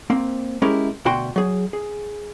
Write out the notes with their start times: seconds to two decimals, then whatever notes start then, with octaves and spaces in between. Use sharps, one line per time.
0.10 A#3 C4
0.62 G#3 C#4 E4 G4 A#4
1.05 D2 B2 F#4 F#5 G5 C6
1.36 F#3 G#4
1.73 G#4